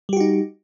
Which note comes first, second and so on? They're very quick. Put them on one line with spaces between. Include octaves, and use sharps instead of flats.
G3 G4 F#4 D#4